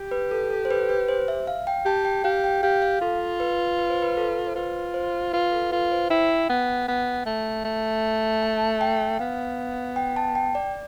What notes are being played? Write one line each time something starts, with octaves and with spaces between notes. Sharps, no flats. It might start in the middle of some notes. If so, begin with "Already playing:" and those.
Already playing: G4
B4
A4
A4
C5
B4
B4
C5
E5
F5
G5
G4 A5
G5
G4 F5
G5
G4 F5
F5
F4 A4
B4
B4
C5
B4
A4
C5
F4 B4
C5
F4 B4
A4
F4 B4
C5
E4 G5
B3
B3
A3
A3
A5
G5
B3 F5
G5
A5
G5
D5